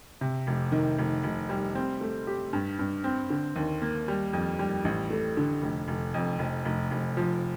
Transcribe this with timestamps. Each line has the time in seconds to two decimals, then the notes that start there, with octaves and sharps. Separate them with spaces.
0.21 C3
0.47 F1
0.72 D#3
0.99 F1
1.23 F1
1.49 G3
1.75 C4
2.01 A3
2.27 G4
2.53 G2
2.79 G2
3.04 C4
3.30 D3
3.56 D#2
3.82 A#3
4.08 G3
4.33 F2
4.59 G3
4.85 A1
5.10 A3
5.37 D3
5.62 F1
5.88 F1
6.14 F2
6.39 F1
6.65 F1
6.91 F1
7.17 F3